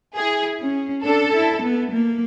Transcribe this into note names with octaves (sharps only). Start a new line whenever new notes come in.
E4 G#4
C#4
D4 A4
E4
B3
A#3